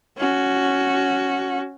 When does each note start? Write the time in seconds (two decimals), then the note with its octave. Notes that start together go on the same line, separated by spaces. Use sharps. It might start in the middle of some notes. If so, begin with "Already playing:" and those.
0.17 C#4 F#4